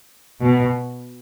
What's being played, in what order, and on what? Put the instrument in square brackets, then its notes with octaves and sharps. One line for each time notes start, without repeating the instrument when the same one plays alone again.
[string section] B2